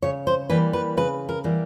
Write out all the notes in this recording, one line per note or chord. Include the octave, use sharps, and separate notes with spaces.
C#3 C#5
C5
E3 G3 A#3 B4
B4
C#3 B4
A#4
E3 G3 A#3